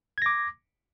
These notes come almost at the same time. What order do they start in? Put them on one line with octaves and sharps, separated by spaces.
G#6 A#6 D6